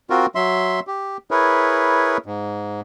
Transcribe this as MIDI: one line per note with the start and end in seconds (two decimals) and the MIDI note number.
0.10 0.26 60
0.10 0.26 65
0.10 0.26 66
0.10 0.26 70
0.35 0.80 54
0.35 0.80 76
0.35 0.80 84
0.87 1.17 67
1.31 2.17 64
1.31 2.17 68
1.31 2.17 70
1.31 2.17 71
1.31 2.17 73
2.26 2.81 44